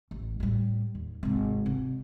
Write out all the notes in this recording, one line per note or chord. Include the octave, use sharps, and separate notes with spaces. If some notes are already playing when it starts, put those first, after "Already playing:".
A1
A2 G3
D#2
G#1 C3
C3